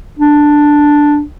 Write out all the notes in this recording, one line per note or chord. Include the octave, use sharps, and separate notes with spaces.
D4